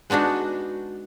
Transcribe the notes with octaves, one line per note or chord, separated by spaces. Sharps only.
G#3 B3 D4 D#4 F#4